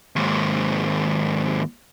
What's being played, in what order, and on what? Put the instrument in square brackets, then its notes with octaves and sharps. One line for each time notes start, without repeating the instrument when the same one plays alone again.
[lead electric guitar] D#2 G#2